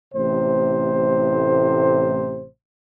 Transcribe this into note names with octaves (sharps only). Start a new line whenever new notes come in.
A1 A2 C3 C5